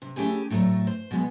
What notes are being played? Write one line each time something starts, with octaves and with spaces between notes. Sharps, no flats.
C3
A3 C#4 E4 G4 G#4
A2 F#3 A3 A5 A#5
C5
B2 G#3 B3